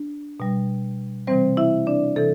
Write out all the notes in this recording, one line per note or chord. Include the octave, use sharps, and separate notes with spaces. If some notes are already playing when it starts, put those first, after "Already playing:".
Already playing: D4
B2 G3
C3 E3 G3 C4 C5
E4 E5
D4 D5
C3 E3 A4